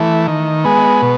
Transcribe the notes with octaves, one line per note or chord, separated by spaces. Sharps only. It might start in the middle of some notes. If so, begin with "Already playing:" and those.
Already playing: E3 A3
D#3
G#3 B3
B2